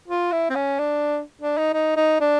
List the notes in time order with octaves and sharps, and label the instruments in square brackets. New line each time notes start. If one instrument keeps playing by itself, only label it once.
[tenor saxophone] F4
E4
C4
C#4
D4
D4
D#4
D#4
D#4
D4